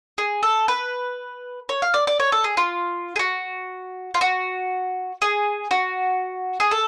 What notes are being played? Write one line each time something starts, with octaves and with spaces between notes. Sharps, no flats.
G#4
A4
B4
C#5
F5
D5
D5
C#5
A4
G#4
F4
G#4
F#4
F4
F#4
G#4
F#4
G#4
A4